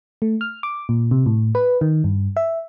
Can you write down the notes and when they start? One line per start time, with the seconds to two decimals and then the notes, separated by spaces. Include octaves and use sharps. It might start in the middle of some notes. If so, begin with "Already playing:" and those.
0.22 A3
0.41 F6
0.63 D6
0.89 A#2
1.11 C3
1.26 A2
1.55 B4
1.81 D#3
2.04 G2
2.37 E5